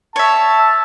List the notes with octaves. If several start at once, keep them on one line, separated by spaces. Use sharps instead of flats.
C#5 E5 A5